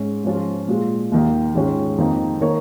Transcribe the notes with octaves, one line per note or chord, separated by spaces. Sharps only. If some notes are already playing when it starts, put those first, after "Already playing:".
Already playing: G#2 G#3 C#4
G#2 F3 C#4 F4
A#2 G#3 F4
D#2 D#3 A#3
G#2 D#3 G#3 C#4 F4
F2 D#3 A#3 D#4
D#3 A#3 D#4 A#4 C#5